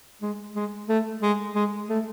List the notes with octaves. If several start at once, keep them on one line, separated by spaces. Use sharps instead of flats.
G#3
G#3
A3
G#3
G#3
A3